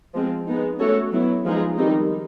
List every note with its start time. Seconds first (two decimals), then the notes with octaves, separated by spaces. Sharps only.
0.14 F3 G#3 C4
0.47 G#3 B3 D#4
0.79 A3 C#4 F#4 A4 C#5
1.13 F#3 B3 E4
1.45 F3 G#3 B3 D#4 G#4
1.77 D#3 G3 C4 D#4